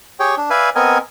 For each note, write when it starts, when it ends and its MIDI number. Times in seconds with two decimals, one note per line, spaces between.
0.20 0.35 67
0.20 0.35 68
0.20 0.35 73
0.20 0.35 79
0.38 0.50 62
0.50 0.70 71
0.50 0.70 74
0.50 0.70 76
0.50 0.70 77
0.50 0.70 80
0.75 0.98 59
0.75 0.98 60
0.75 0.98 70
0.75 0.98 75
0.75 0.98 80